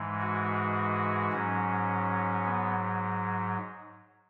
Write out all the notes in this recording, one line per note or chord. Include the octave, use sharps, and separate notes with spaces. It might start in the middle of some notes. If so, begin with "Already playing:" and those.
Already playing: G#2 E3 G#3
F#4
G#2 F#3 C#4
B3